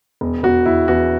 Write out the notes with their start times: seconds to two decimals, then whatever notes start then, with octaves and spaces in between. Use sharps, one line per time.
0.21 E1
0.43 E1 F#4
0.66 E1 E4
0.88 E2 F#4